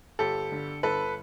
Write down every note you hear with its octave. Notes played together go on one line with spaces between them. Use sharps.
G1 G4 A4
D3
G1 A4 B4